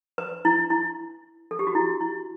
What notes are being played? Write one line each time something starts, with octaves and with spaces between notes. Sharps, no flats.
B4
E4
E4
A4
G4
F#4
E4
E4